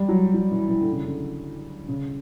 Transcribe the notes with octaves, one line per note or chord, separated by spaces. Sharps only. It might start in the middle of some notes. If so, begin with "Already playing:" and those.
Already playing: G3
F#3
F#3
E3
E3
D3
C#3
D3
C#3